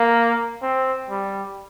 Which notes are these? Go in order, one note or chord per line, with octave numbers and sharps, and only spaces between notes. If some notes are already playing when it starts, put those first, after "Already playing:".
Already playing: A#3
C4
G3